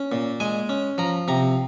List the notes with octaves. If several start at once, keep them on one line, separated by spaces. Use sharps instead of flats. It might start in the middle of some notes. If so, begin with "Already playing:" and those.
Already playing: C#4
A#2
G#3 G#5
C#4
F3 A#5
C3 A#5